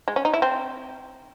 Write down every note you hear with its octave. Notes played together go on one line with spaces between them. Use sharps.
G#3
C#4
D#4
E4
C4